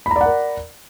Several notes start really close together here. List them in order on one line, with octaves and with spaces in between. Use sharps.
B5 A#5 D5 F#5 A#4